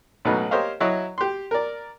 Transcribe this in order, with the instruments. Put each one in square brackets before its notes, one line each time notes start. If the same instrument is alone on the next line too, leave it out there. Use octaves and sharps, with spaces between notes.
[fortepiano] A1 B2 F#3 D#4 B4
G4 A#4 C5 C#5 D#5 F5
F#3 E4 C#5 D#5
G4 C6
A#4 D5